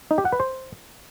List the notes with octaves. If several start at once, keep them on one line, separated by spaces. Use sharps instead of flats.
D#4
G4
F#5
B4
C5